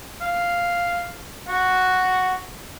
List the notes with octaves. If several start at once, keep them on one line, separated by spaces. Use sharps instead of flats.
F5
F#4 F#5